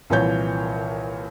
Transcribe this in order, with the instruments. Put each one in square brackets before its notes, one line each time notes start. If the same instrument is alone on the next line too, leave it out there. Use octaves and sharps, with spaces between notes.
[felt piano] C2 A#2 E3 F3 C#5 G6